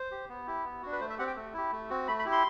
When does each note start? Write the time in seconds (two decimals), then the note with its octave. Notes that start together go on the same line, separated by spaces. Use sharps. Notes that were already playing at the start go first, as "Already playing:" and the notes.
Already playing: C5
0.11 G4
0.29 B3
0.47 E4 G4
0.64 B3
0.82 D4 F#4
0.92 B4
1.00 A3 C5
1.10 E5
1.19 C4 G4 F#5
1.27 G5
1.36 A3
1.54 E4 G4
1.72 A3
1.90 C4 F#4
2.08 A3 B5
2.19 B5
2.25 E4 G4
2.32 C6